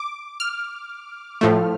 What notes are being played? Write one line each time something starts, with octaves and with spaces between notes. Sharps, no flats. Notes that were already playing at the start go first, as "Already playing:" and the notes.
Already playing: D6
F6
A2 F3 A3